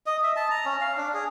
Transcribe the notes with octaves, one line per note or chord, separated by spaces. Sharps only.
D#5
E5
A5
A#5
C#4
F5
D4
G#4